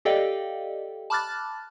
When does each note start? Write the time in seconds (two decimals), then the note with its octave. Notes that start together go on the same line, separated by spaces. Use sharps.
0.05 G4 A4 D5 D#5 F5 G5
1.10 A5 B5 D6 F6 F#6 A6